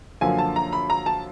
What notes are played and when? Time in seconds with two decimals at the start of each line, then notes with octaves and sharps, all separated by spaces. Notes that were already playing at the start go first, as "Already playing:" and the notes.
0.21 F#2 D3 F3 A#3 G#5
0.39 A5
0.56 A#5
0.73 B5
0.90 A#5
1.06 A5